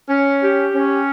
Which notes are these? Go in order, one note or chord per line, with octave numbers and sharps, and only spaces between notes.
C#4
G4
C#4